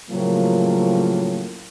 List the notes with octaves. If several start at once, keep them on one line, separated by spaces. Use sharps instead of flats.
A2 C#3 F3 F#3 A#3